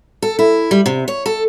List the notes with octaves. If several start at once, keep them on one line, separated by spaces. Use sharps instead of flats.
A4
E4
G3
C3
C#5
A4